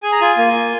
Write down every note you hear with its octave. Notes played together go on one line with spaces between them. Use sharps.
G#4 G#5
A#5
F4 G#5
A#3
F4